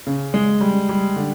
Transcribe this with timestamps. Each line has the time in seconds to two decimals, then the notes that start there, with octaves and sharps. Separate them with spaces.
0.07 C#3
0.34 G#3
0.61 G3
0.89 G3
1.16 D3